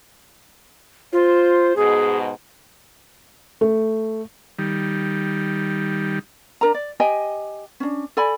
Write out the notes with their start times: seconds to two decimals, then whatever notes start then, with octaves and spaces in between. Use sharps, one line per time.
1.13 F4 C5
1.76 G#2 B2 G#4
3.61 A3
4.59 D#3 G3
6.61 D4 A#4 A#5
6.74 D5
7.00 G4 D#5 G5 G#5
7.80 C#4 D4
8.17 A4 D5 G#5 B5